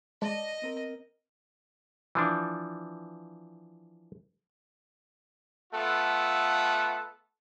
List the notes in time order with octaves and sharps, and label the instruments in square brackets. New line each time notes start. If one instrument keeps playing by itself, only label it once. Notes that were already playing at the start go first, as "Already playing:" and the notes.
[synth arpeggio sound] G#3 [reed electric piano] D5 A5 [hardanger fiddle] D#5
[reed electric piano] B3 C4 A#4
[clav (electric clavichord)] E3 F3 D4
[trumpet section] A3 B3 F4 A4 F#5